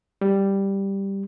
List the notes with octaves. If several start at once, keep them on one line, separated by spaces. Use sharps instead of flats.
G3